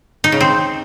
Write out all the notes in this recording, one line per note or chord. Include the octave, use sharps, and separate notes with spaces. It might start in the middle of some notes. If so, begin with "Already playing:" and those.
D#4
C#3
C4